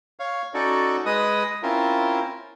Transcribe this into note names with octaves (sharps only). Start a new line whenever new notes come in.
C#5 F5
C#4 D#4 F#4 A4 D5
G#3 B4 D#5 D#6
C4 C#4 E4 F4 A#4